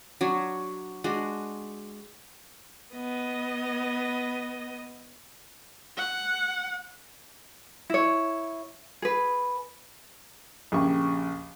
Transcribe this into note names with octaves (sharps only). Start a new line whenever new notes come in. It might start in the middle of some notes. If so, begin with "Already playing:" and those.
F#3 D4 C#5
G#3 D4 F#4
B3 D#5
F#5
E4 C#5
G#4 B4
A#1 C#3 G4 C#6